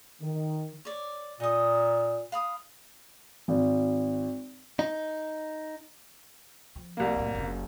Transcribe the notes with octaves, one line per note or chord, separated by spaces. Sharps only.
D#3
C#5 D5
A#2 D#4 D#6
F5 B5 D#6
G#1
D#4
F3
C2 A#3
F#2 A2
F#1 C#3